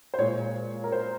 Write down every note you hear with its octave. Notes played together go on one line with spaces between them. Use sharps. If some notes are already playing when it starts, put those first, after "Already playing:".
C5
A#2 G#3 C#5
A#4
C5